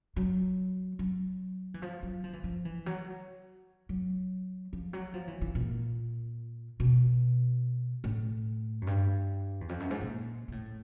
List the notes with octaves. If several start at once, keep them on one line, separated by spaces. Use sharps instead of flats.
F#3
F#3
E3
F3
F#3
F3
E3
F3
E3
F#3
F#3
F3
F#3
F3
E3
E3
A#2
B2
A2
F#2
G2
E2
F2
F#2
G#2
A#2
A#2
A2